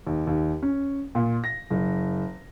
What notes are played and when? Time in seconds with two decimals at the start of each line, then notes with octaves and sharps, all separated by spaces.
0.07 D#2
0.27 D#2
0.63 C#4
1.15 A#2
1.44 A#6
1.70 F#1